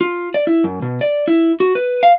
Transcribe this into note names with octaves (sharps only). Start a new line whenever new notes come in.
F4
D5
E4
F#2
B2
D5
E4
F#4
B4
F5